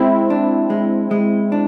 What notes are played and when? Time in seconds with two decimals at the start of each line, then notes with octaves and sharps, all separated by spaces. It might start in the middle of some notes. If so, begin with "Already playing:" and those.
Already playing: G#3 C4 E4
0.30 D4
0.70 G#3
1.11 G#3
1.52 D4